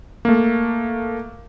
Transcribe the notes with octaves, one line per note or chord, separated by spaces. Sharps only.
A3 A#3